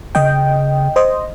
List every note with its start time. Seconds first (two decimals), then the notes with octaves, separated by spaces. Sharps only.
0.15 C#3 D#5 G5
0.96 C5 D#5